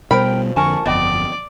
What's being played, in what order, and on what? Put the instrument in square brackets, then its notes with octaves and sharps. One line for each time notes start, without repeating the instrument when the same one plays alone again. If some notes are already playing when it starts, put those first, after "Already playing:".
[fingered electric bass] B2 G3 B3 [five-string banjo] F3 B5 [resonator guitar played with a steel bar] A#4 G5
[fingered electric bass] F2 D3 [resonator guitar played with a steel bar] A#4 G#5 A5 [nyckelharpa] C#6
[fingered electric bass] G1 F2 [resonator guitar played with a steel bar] B3 D#5 G5 [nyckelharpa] D5